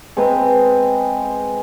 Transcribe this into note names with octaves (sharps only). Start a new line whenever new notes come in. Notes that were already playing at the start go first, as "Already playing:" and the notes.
G#3 C4 B4